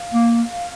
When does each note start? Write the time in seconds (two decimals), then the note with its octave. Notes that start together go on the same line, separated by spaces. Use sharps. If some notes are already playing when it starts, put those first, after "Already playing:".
Already playing: F5
0.14 A#3